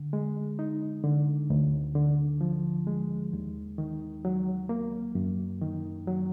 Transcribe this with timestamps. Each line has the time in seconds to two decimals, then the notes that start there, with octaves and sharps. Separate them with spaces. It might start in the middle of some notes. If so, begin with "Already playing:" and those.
Already playing: D3
0.13 G#3
0.59 D#4
1.04 D3
1.50 D2
1.95 D3
2.41 F3
2.87 G#3
3.33 D#2
3.78 D#3
4.25 F#3
4.69 A#3
5.15 F#2
5.62 D#3
6.07 F#3